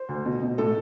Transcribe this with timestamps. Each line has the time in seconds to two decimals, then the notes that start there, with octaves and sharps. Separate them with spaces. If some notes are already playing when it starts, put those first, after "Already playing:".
Already playing: C5
0.09 D2
0.25 B2
0.42 B2
0.58 A2 A4